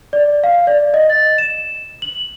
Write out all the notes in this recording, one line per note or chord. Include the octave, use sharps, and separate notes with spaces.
D5
F5
D5
D#5
A6
E7
F#7